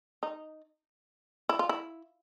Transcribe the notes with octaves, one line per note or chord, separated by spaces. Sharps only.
D#4
E4
F4
E4